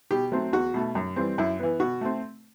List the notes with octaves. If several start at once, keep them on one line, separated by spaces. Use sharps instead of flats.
B2 G4
F#3 A3 C4
E2 F#4
B2 A3
F#2
E3 G3 C4
F#2 E4
E3 B3
B2 F#4
A3 C4